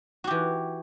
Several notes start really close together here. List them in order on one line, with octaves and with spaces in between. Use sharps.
F#4 G4 E3